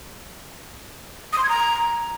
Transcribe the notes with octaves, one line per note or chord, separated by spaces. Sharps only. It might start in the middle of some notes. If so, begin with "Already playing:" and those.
D#6
C6
G#6
A#5